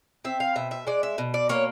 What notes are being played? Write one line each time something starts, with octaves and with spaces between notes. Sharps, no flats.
C4 E5
F5
B2 E5
E5
G#3 D5
E5
B2
D5
A#3 C#5